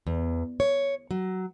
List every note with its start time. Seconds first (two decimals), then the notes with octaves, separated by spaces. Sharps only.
0.07 E2
0.60 C#5
1.11 F#3